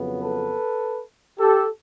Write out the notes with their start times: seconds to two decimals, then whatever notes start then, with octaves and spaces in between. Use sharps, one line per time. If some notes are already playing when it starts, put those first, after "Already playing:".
Already playing: F2 C#3 F#3 B3
0.21 A4 B4
1.40 G4 A4